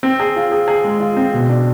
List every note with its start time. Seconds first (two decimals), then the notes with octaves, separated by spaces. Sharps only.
0.03 C4
0.20 G#4
0.36 F4
0.52 G#4
0.68 G#4
0.84 G#3
1.00 F4
1.17 C4
1.34 B2
1.49 D4